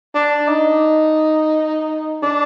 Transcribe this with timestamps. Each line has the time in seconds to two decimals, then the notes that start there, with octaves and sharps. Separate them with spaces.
0.15 D4
0.48 D#4
2.23 D4